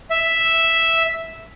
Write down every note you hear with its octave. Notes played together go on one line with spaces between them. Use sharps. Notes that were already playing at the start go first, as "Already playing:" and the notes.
E5